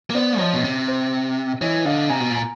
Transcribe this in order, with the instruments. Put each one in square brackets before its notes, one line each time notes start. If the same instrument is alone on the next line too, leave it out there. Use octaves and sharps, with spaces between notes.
[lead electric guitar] A#3
[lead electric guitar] B3 [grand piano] C5 D5
[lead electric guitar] F3 [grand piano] C#5 D#5
[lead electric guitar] B2
C3
[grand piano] C5
[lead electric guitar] E3 [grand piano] C#5 D#5
[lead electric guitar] D3 [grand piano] D#5 F5
[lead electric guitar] C3 [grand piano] G#5 A#5
[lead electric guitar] B2
[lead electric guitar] A#2 [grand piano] G#5 A#5